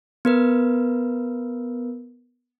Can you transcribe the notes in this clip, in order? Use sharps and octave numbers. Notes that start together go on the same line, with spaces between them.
B3 A#4 B4